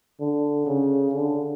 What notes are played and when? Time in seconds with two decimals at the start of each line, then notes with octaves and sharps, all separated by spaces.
0.20 D3
0.66 C#3
1.13 D3